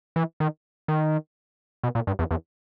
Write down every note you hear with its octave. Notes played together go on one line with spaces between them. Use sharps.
E3
D#3
D#3
B2
A#2
G2
E2
E2